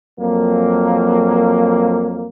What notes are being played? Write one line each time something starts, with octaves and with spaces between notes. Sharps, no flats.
F2 F#3 A#3